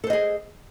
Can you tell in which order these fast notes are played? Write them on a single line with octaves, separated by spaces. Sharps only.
A4 C5 D#5 G#4